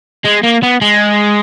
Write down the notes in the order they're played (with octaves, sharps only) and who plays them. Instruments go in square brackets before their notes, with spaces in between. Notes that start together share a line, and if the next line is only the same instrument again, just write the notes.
[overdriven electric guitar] G#3
A#3
B3
G#3